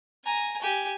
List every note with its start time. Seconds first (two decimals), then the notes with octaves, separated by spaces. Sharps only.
0.24 G#5 A#5
0.62 G4 G#5